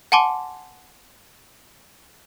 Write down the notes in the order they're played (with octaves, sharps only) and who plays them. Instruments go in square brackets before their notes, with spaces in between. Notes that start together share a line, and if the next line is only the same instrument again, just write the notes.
[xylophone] F#5 G#5 A5 C6 D6